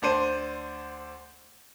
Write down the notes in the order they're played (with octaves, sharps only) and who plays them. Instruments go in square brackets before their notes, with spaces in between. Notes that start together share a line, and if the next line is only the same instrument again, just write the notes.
[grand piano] D2 D4 C5 D#7